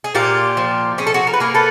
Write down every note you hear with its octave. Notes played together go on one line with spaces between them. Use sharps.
G#4
A#2 F4 G4
F3
C#4 G#4
A4
F#4 G#4
A#4
B4
A#3 G#4 A#4
A4 B4